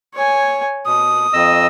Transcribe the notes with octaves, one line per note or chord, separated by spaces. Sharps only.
C#5 G#5
B2 D#6
F2 D#5 E6